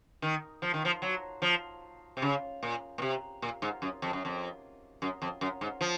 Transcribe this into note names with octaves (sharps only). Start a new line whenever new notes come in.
D#3
F3
D#3
F3
F#3
F3
C3
C#3
A#2
A#2
C3
A#2
G#2
F#2
F2
F#2
F2
F#2
F2
F#2
G#2
F3